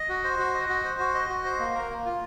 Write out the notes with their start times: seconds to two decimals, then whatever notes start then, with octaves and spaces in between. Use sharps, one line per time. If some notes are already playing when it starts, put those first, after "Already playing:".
Already playing: D#5
0.09 F#4
0.24 C5
0.39 F#4
0.54 D#5
0.69 F#4
0.84 C5
1.00 F#4
1.14 D#5
1.30 F#4
1.45 C5
1.60 A#3
1.75 A#4
1.90 A#3
2.05 F4